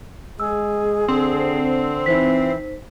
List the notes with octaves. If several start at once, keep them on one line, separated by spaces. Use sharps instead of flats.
G#3 G#4 E6
D3 C4
E3 D#4 C5 B6